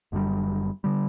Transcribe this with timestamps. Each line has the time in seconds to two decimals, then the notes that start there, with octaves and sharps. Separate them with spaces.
0.12 F#1 F#2 D3 G3
0.84 D3 G3